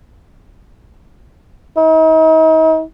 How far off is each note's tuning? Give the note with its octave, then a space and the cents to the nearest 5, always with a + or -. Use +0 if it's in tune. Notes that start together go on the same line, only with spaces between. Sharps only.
D#4 +40